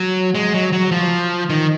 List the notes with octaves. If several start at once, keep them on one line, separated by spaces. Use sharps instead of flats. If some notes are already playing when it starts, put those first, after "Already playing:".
Already playing: F#3
G#3
F#3
F#3
F3
D#3